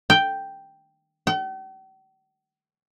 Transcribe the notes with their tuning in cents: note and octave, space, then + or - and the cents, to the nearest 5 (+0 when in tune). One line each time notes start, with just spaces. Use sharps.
G5 +0
G5 -45